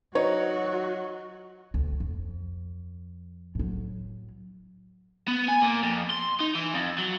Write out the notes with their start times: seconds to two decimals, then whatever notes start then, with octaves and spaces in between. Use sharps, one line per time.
0.15 F#3 D#4 F#4 C#5
1.74 D2
2.00 F2
3.55 A2 F#3
5.28 B3
5.48 G#5
5.62 A#2
5.83 F2
6.10 C6
6.40 D#4
6.55 E3
6.74 F2
6.98 F#3